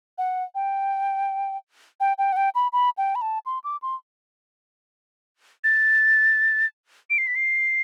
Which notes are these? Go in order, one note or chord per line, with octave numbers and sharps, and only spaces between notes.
F#5
G5
G5
G5
F#5
G5
B5
B5
G5
B5
A5
C6
D6
C6
A6
D7
C7
B6
C7